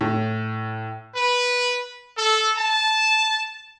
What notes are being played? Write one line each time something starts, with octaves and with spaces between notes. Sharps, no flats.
A2
B4
A4
A5